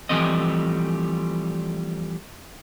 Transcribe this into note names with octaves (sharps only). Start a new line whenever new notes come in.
E3 F3 G3 A3 C4 D#5